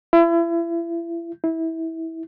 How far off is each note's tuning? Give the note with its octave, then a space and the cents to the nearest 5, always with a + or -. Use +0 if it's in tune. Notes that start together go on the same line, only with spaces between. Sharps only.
E4 +35
E4 -20